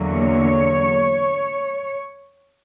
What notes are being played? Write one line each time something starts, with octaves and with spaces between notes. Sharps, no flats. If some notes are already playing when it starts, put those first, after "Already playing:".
Already playing: E2 D3 F#3 A#3
C#5